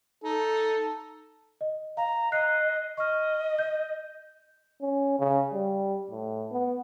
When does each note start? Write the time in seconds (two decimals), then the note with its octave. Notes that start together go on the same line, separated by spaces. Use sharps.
0.24 D#4 A4
1.61 D#5
1.97 F5 A#5
2.32 D#5 F#6 C7
2.97 D#5 C#6 F6
3.59 G6
4.81 C#4
5.19 C#3
5.52 G3
6.11 A2
6.51 B3